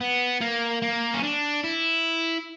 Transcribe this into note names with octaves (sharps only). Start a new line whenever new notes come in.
B3
A#3
A#3
C#4
D4
E4